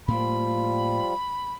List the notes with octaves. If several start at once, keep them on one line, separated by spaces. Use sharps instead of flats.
A2 F3 G3 A#3 F4 B5